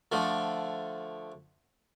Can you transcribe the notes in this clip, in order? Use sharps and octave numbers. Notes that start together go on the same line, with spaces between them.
D3 F3 A3